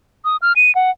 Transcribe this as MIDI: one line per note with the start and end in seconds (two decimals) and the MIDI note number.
0.25 0.37 87
0.42 0.53 89
0.56 0.74 99
0.75 0.91 78